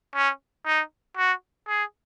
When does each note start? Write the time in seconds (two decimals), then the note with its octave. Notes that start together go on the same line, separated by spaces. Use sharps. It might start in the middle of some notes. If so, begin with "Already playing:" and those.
0.15 C#4
0.66 D#4
1.17 F#4
1.68 G#4